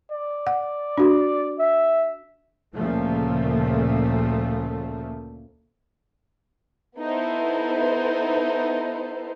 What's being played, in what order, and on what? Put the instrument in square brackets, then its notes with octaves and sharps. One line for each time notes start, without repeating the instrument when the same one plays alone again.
[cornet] D5
[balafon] F#5
D4 F#4
[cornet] E5
[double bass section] D2 A#2 C#3 F3 A3
[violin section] B3 D#4 E4 A4 B4 C5